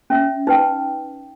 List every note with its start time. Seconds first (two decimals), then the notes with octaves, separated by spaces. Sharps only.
0.10 C#4 E5
0.47 D#4 B4 G5